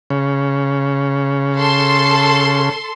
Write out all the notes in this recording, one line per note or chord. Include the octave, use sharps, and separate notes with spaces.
C#3
A4 C6